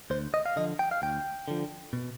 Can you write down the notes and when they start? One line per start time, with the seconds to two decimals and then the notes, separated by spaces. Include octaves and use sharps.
0.10 D2 C5
0.34 D#5
0.46 F5
0.56 D3 F3 D#5
0.79 G5
0.91 F5
1.02 D2 G5
1.48 D3 F3
1.93 B2